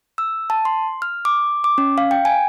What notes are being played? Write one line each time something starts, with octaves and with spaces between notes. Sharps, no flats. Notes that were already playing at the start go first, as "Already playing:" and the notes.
E6
A5
C6
F6
D6
D6
C#4
F5
G5
G#5